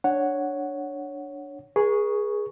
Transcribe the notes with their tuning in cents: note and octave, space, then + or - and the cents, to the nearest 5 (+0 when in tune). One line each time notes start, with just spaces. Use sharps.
D4 +0 C#5 +0 F#5 +0
G#4 +0 B4 -45 C#6 +0